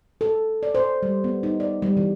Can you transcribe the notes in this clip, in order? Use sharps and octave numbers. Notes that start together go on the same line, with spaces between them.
A4
D5
C5
G3
B3
D#4
D5
G3
E3